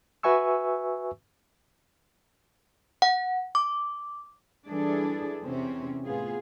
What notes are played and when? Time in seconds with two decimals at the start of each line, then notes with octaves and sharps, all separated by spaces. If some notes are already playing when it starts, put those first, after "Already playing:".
0.23 F#4 B4 E5 G#5 C#6 E6
3.02 F#5
3.55 D6
4.67 E3 G3 D4 G#4 A4 D5
5.44 E2 C3 C4 C#4
6.06 A2 B3 F4 G#4